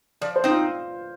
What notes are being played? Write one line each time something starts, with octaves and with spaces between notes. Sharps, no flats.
F3 D5
C5
C4 D#4
F4